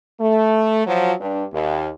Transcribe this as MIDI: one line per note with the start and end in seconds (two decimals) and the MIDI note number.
0.20 0.84 57
0.86 1.12 53
0.86 1.12 54
1.20 1.44 43
1.20 1.44 62
1.53 1.88 39